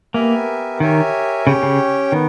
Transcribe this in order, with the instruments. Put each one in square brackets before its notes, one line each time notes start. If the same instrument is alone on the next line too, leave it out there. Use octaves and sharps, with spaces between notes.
[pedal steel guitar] A#3 [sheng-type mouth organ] B3 G4 A#4 E5 G#5
[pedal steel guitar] D#3 [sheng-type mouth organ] G4 A#4 C#5 E5 G#5
[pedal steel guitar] C#3 [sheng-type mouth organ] C#4 G4 C#5 G5
[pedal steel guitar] C#3
[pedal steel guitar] D#3 [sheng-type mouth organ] B3